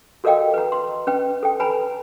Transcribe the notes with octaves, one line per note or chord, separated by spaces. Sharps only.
F#4 A4 A#4 D#5 F5 G5
B4 A#5
C6
C#4 B4 G5
A4 G5
B4 G#5 A#5 B5